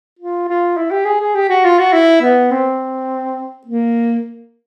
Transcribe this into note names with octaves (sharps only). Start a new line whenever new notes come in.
F4
F4
E4
G4
G#4
G#4
G4
F#4
F4
F#4
E4
B3
C4
A#3